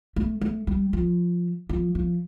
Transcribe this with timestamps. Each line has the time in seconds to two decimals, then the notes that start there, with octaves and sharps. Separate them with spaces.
0.16 A3
0.41 A3
0.67 G3
0.93 F3
1.69 F3
1.95 F3